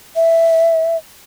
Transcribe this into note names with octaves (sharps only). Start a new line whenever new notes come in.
E5